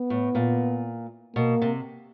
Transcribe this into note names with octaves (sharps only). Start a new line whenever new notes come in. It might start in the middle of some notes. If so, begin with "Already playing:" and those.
Already playing: B3
A2
A#2
B2 A#3
C3